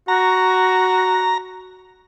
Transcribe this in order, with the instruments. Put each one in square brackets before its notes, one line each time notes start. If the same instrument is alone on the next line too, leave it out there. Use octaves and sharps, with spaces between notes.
[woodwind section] F#4 [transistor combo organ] A#5